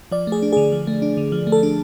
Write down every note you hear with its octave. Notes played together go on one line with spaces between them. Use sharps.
F3 D5
A3 G#4
D4
D3 G#4
F3
A3
D4
D3
F3
A3
A4
D4